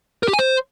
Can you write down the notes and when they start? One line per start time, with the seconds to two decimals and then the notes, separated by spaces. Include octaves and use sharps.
0.23 A#4
0.28 G4
0.33 G#5
0.39 C5